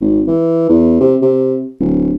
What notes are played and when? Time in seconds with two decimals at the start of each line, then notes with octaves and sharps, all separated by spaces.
0.01 G#1
0.27 E3
0.69 E2
1.00 C3
1.22 C3
1.80 D1